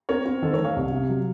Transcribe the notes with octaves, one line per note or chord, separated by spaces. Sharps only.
C4 A#4 C#5
C4
D#3 A4 C5
A#4 C#5
D#3
C#5 F5
C2
C3
F#3